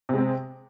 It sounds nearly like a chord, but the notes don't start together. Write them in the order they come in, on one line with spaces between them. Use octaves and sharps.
C3 G#3 C4